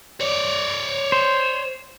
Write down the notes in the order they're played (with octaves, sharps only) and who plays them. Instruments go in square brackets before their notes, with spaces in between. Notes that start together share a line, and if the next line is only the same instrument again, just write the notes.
[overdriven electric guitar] C#5 D5
[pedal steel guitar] C5